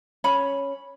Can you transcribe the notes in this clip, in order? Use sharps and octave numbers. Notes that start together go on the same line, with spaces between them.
C#4 B5